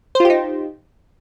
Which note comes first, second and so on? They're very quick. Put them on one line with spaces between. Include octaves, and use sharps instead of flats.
C5 F4 G4 D#4